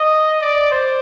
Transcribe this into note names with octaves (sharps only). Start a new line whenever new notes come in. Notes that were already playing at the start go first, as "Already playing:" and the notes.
Already playing: D#5
D5
C5